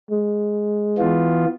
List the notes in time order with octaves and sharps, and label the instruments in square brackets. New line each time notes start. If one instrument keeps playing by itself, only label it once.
[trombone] G#3
[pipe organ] E3 B3 F4